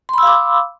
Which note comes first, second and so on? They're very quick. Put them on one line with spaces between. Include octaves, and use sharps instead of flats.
C6 B5 E6 F5 D6